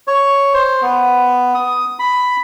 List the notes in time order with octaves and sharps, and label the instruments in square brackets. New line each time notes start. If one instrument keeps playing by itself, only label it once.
[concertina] C#5
C5
B3
D#6
B5